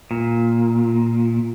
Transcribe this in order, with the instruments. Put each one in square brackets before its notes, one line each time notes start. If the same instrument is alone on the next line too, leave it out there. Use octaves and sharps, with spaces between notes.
[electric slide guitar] A#2